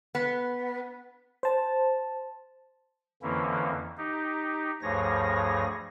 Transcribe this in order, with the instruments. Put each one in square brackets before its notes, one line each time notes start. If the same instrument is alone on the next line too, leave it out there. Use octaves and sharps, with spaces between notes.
[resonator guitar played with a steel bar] B3
[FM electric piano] C5 A5
[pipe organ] F2 D3 E3 A#3 C#4 E4
D#4 G4
D2 G2 F3 G#4 C#5 A#6